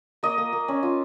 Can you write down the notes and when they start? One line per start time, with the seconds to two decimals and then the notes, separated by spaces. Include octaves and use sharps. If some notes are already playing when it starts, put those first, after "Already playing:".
0.23 A#3 D#5
0.38 A#3
0.53 A#3
0.68 C#4
0.83 F4